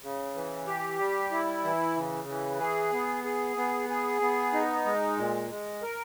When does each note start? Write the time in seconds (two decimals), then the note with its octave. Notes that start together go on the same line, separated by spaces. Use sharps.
0.03 C#3
0.35 E3
0.67 G4
0.99 G3
1.31 E4
1.64 E3
1.96 C#3
2.28 E3
2.60 G#4
2.92 B3
3.24 G#4
3.57 B3
3.89 G#4
4.21 B3
4.53 D#4
4.85 G#3
5.17 A#2
5.50 G#3
5.82 A#4